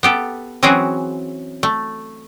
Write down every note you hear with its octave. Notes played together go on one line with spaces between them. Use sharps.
B3 G4 A4
E3 F#3 C4 C#4 F#4 G#4
A3